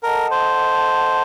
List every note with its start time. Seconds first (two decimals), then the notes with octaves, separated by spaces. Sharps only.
0.03 A4 A#4 D#5 F#5 A5
0.31 C5